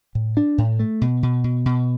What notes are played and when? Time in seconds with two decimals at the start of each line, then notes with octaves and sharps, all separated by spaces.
0.15 A2
0.37 D4
0.58 A2
0.79 A3
1.01 B2
1.23 B2
1.44 B2
1.66 B2